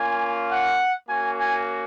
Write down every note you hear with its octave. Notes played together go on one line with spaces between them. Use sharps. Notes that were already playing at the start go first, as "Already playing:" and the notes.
Already playing: A#3 C#4 F4 G#5
F#5
A#3 C#4 F#4 G#5
G#5